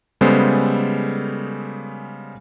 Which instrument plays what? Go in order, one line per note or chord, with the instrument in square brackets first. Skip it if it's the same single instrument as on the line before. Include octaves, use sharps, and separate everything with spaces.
[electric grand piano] C#3 G3 G#3 B3 A4 C5